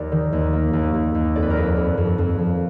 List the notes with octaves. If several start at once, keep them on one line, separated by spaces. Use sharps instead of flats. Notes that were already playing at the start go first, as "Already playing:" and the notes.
Already playing: D#2 A#4 D5
D#3
D#2
A#3
D#2
D#2
D#2
F2 D5
B4
A#4
F2 B4
F2
F2
F2
F2